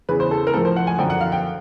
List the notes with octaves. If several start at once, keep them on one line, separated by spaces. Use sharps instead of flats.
E2 C#3 E3 B4
C5
A4
A#4
A2 F3 A4
C5
F#5
G#5
F#2 D3 F3 G5
F#5
F5
G5